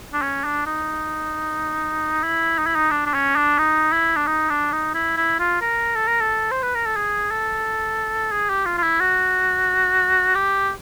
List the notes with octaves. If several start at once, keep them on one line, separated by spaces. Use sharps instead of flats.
D4
C#4
D4
D#4
E4
D#4
E4
D#4
D4
D4
C#4
D4
D#4
E4
D4
D#4
D4
D#4
E4
E4
F4
A#4
A4
A#4
A4
C5
B4
A#4
A4
G#4
A4
G#4
G4
F4
F4
E4
F#4
G4